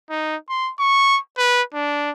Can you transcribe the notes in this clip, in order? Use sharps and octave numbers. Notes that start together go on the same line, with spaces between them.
D#4
C6
C#6
B4
D4